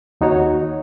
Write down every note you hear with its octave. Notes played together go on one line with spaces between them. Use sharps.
D#2 D#4 F#4 C#5